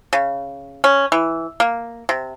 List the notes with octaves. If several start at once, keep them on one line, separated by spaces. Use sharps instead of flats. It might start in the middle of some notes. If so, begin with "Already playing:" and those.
C#3
C#4
E3
A#3
C3